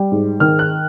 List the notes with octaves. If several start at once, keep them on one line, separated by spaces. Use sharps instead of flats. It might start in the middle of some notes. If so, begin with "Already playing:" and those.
Already playing: G3
G#2
D#3 F6
F#6